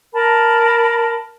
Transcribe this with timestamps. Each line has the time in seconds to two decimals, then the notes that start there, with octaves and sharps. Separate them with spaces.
0.13 A#4 A5 B5